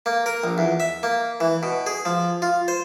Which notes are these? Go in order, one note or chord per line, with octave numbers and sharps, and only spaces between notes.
A#3
A#4
A#1
E2
E5
A#3
E3
B2
G#4
F3
F4
C5